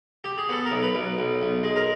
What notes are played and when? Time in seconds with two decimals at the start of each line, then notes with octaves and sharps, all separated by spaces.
0.24 G4
0.38 G#4
0.49 B3 A4
0.65 A#4
0.71 B1
0.83 B4
0.95 B1
1.18 B1
1.41 B1
1.63 G#3
1.76 A#4